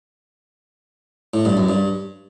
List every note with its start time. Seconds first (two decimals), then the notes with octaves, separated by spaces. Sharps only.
1.34 A2
1.45 G2
1.57 F#2
1.69 G2